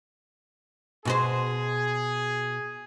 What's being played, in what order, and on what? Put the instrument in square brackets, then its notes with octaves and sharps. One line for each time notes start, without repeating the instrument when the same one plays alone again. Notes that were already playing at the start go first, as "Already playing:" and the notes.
[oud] B2 F#4 C5 [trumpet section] G#4